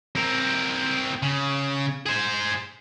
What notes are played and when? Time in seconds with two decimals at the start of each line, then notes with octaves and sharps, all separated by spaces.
0.16 C4 A#4
1.23 C#3
2.06 G#4 C5